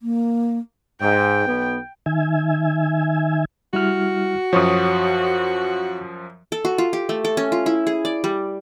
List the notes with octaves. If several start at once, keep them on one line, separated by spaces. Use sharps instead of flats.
A#3
G#2 G5
B1 B3
D#3 E5 G#5
G3 E4 F#4 F6
F#2 F3 C#5 C#6 D#6
A4
F#4
F4
G4
A3
A4
C#4
F4
E4
G#4
D5
G3